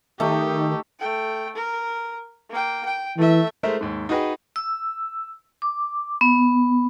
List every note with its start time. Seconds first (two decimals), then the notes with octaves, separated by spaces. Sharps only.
0.20 D#3 A3 D#4 G4
0.99 A3 G5
1.55 A#4
2.50 A#3 G5
2.86 G5
3.18 E3 A3 E5
3.63 G#3 A3 A#4 C5 E5
3.81 D#2 G#2
4.09 D#4 F#4 G#4 B4 D#5 G5
4.56 E6
5.62 D6
6.21 B3